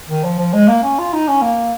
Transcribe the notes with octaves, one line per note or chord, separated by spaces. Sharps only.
D#3
F3
F3
G#3
A#3
C#4
F4
D#4
C#4
A#3